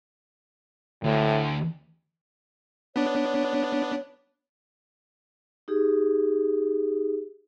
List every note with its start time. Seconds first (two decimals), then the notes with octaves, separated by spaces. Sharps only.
1.03 D2 A2
2.96 B3 D4 C#5
5.68 D#4 G4 G#4